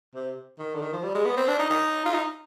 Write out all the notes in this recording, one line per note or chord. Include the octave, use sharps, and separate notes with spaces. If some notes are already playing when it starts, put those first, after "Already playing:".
C3
D#3
D3
D#3
F3
G3
G#3
B3
C4
D4
D#4
D#4
F4
D#4